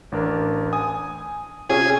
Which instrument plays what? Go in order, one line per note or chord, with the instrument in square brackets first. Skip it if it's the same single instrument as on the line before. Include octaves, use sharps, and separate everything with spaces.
[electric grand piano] A1 D4 A#4
[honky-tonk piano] G#5 [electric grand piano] D#6
[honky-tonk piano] C3 C#4 F4 [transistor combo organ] G#4